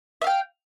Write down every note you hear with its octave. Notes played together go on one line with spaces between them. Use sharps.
E5 F5 G5